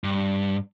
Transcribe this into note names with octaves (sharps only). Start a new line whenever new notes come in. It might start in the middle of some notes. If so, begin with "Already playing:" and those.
G2